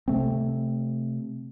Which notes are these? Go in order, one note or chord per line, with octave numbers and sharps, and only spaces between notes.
C3 A3 C4